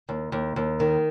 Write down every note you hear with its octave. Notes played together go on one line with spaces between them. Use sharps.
D#2
D#2
D#2
D#3